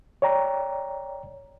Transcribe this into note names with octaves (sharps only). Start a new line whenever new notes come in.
C#5 D5 G5 A#5